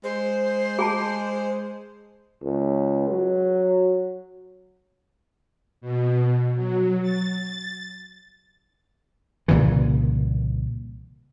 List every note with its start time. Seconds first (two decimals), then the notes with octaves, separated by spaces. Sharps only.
0.04 G#3 C5
0.79 G#4 G#5 A5
2.43 C#2
3.10 F#3
5.81 B2
6.56 F#3
7.02 A6
9.48 C2 A#2 C#3 E3